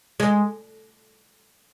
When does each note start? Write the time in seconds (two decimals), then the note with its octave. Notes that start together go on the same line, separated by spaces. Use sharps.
0.20 G#3